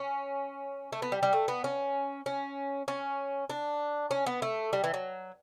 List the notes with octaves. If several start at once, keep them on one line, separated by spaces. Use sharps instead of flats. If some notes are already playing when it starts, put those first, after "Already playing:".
Already playing: C#4
A3
B3
G3
G3
A3
B3
C#4
C#4
C#4
D4
C#4
B3
A3
G3
E3
F#3